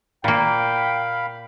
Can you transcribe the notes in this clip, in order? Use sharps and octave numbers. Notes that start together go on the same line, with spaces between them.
A#2 A#3 F5 G5 B5